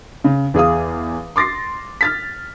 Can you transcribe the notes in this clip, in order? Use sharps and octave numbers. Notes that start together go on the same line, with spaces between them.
C#3
E2 G#4 F5 D#6
C6 D6 A6 A#6 C7
F6 A6 B6